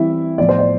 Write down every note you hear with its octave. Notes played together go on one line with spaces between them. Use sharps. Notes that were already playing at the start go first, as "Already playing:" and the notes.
Already playing: E3 G3 C4 E4 E5
A2 F3 B3 D5
C5
D5